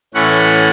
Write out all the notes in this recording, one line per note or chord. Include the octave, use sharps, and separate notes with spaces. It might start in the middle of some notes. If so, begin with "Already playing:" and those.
A2 E3 A3 C#4 F#5